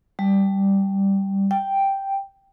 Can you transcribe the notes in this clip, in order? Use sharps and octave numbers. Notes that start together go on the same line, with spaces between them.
G3
G5